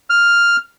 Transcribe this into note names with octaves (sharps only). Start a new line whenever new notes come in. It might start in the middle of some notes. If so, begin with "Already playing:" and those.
F6